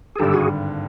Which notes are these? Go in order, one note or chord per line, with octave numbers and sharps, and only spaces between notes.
G#4
G#1 G2 D3 G3 G4 A4
F#4 G#4